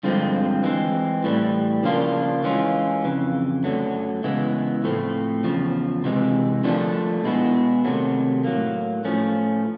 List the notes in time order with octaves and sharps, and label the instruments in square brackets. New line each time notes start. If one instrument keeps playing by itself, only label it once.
[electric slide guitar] G2 D3 F3 G#3 C4
E3 G#3 C4
A2 E3 G3
C#3 F3 A#3 D4 F4
E3 G#3 C#4 F4
F2 C#3 E3
F#2 D3 F#3 A3
C#3 E3 G#3 B3 E4
A2 F3 A3 C4
E2 C#3 F3
C3 E3 G#3
D3 F3 A3 D4
B2 G#3 B3 E4
C3 D#3 F#3 A3
A2 F#3 A#3
A2 F3 A3 C#4